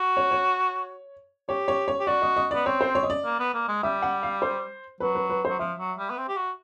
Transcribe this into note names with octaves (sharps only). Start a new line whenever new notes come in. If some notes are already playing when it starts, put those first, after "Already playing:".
Already playing: F#4
C#5
C#5
G4 C#5
C#5
C#5
G4
F#4 D5
D#5
D#5
B3 D5
C4 C#5
C5
C#5
D#5
D5
A#3
B3
A#3
G#3
G3 E5
F#5
F5
C5
F#3 B4
B4
B4
F#3 C5
F3 E5
F#3
G3
B3
C4
G4
F#4